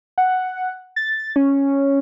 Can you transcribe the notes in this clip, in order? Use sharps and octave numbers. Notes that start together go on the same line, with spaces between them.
F#5
A6
C#4